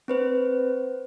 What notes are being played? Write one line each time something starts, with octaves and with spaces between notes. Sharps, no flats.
C4 B4 C5